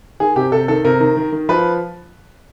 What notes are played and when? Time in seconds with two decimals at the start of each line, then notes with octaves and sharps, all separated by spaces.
0.20 D#3 G#4
0.36 C3 G4
0.52 C3 A4
0.68 D#3 A4
0.84 C3 A#4
1.00 D#3
1.17 D#3
1.32 D#3
1.49 F3 B4